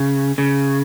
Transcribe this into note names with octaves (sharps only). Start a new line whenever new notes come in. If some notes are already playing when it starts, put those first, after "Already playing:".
Already playing: C#3
C#3